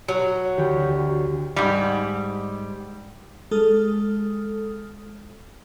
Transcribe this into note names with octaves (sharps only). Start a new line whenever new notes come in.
F#3
D2 G4
G#2 G3
G#3 A4 D#6 F6